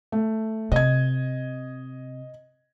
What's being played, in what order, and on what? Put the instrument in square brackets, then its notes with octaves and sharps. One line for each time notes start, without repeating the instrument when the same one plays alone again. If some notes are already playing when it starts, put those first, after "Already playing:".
[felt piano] A3
[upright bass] C3 [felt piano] D#5 G#6